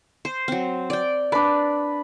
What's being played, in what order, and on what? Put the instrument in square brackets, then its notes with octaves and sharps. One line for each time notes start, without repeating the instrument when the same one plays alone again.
[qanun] C5
F#3 C4
D5 G5
[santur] D4 B4 [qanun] D5